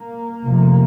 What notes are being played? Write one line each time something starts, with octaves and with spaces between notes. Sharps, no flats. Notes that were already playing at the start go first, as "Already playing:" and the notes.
Already playing: A#3
F1 F2 C3